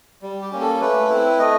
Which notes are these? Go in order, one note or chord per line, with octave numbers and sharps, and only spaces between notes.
G3
G4
A#3 C#4
A4
A3 B4
C4 E4
A3 D#5